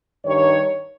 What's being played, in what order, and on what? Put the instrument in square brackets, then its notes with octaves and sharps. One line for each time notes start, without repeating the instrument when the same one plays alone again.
[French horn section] G2 D#3 C#5